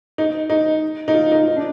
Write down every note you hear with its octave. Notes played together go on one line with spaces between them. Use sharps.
D#4
D#4
D#4
F4
D#4
D#4
D4